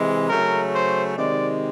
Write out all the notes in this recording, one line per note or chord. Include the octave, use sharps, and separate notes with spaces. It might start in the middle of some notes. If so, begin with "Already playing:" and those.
Already playing: C3 E3 G#3
C#3 F#3 A3 A#4
C5
C3 D#3 G#3 D5